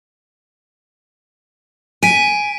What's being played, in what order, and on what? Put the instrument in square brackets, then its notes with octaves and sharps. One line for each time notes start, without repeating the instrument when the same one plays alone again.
[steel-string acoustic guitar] G#5 [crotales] B6 D7 D#7